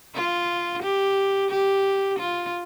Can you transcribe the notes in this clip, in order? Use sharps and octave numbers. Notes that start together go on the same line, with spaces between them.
F4
G4
G4
F4